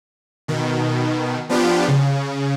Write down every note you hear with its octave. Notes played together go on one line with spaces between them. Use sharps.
B2 D#3
F3 B3 D4 F4 G4
C#3